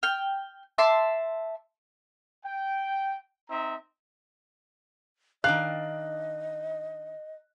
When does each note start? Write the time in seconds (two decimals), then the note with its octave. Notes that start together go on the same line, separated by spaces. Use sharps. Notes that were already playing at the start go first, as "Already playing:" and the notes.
0.03 G5 F6
0.78 E5 A5 C6 D6
2.45 G5
3.50 C4 D#4 E5 A#5
5.44 D#3 D4 D#5 F5 F#6